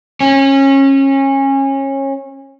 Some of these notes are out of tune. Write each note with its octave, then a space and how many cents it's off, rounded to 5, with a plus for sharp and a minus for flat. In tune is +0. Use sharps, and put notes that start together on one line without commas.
C#4 -25